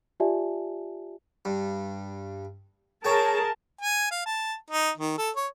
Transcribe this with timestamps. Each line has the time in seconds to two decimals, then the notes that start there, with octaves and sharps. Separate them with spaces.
0.20 F4 G4 D5 E5 G#5 A5
1.45 G2
3.05 G#4 A#4 C#5 G5 A5
3.81 G#5
4.11 F5
4.26 A5
4.71 D#4
4.97 D#3
5.18 A4
5.36 C#5